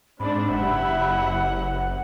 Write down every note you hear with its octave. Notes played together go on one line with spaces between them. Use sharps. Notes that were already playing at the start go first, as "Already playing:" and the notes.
G#2 C4 D4 D5 B5
F#1 E4 G4 E5 F#5